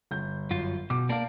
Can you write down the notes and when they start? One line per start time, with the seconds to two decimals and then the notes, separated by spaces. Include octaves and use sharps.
0.11 G1 G6
0.51 F#2 F4
0.90 B2 D6
1.09 A#3 A#4 D5 F5 A5